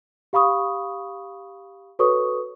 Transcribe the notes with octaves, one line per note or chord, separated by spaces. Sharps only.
G4 F5 B5 C#6 D#6
F#4 A4 B4 C#5 C#6 D#6